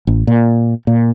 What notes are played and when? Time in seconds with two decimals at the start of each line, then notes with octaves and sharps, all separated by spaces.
0.07 A1
0.27 A#2
0.87 A#2